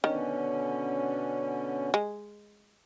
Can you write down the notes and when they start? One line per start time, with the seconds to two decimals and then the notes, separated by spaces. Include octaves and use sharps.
0.04 B2 D3 D#3 C#4
1.94 G#3